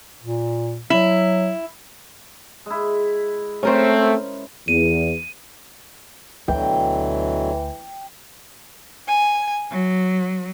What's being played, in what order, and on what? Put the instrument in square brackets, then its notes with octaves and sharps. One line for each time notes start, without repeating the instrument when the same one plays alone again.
[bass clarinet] A#2
[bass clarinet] F#3 [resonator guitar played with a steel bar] E4
[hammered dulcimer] G#3 E4
[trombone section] A3 C4 [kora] C#4 A#4 C5
[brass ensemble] E2 [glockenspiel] D#7
[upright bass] D2 [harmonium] B2 D3 F#3 [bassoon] E3 [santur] G5
[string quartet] G#5
F#3